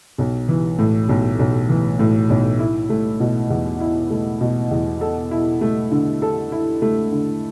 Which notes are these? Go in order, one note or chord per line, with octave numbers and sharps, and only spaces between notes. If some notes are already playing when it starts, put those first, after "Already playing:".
B1
E3
A2
B1
B1
E3
A2
B1
E4
A3
B2
E2
E4
A3
B2
E2
A4
E4
A3
D3
A4
E4
A3
D3